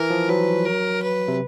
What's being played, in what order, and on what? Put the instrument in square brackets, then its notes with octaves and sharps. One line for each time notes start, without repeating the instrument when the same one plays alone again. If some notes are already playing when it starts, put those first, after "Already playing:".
Already playing: [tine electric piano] E3 [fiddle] A#4
[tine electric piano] F3
[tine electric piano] F#3 [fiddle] B4
[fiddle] A#4
B4
[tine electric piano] C3